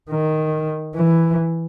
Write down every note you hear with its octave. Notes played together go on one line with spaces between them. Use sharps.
D#3
E3